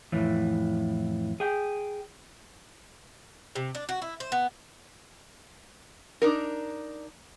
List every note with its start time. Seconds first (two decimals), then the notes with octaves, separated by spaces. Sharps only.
0.12 F2 A2 E3
1.40 G#4 G5
3.55 C3
3.75 D4
3.89 F#4
4.02 E4
4.20 C5
4.32 B3
6.22 D4 D#4 A#4